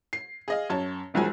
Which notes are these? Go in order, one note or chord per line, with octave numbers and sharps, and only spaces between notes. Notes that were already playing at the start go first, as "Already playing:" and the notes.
C7
G#4 D#5 F5
F#2 C#5 A5
E1 B1 F3 G#3 G#5